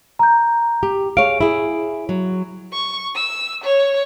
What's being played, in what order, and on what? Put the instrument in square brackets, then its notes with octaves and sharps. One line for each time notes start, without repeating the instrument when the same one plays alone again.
[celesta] A#5 G6
[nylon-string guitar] G4
[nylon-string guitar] G#4 C#5 F5 [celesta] D7
[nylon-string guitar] E4 G#4
F#3
[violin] C#6
E6
C#5